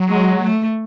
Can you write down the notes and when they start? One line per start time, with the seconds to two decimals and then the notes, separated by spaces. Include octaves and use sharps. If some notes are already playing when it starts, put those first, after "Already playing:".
Already playing: F#3
0.08 G#3
0.42 A3